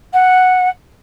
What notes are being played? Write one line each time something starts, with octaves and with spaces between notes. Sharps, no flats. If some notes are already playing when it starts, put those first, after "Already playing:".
F#5